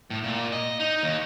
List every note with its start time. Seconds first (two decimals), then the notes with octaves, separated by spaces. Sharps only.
0.10 A2
0.24 A#2
0.52 D#5
0.80 D#4
1.03 D#2